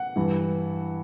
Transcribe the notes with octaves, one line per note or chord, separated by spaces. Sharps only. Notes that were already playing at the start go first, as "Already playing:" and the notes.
Already playing: F#5
G2 E3